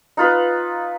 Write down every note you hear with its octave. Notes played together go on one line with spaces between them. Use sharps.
D#4 F4 B4